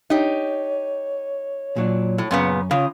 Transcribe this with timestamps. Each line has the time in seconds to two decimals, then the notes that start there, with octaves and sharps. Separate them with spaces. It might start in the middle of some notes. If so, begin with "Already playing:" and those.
0.10 D#4 G4 C#5
1.76 A#2 F#3 D4
2.18 A2
2.31 F#2 A#2 C#3 B3 C#4
2.71 C#3 C#4 F4 D#6